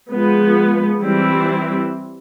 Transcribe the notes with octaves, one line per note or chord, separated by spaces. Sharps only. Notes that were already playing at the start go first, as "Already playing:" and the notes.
F3 G#3 B3
E3 G3 C4 E4